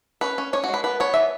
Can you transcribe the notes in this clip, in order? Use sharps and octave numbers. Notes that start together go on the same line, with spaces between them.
C#4 B4
C#4
C#4 C#5
F#4
G#3
B4
B3 B4
B3 C#5
E3 E5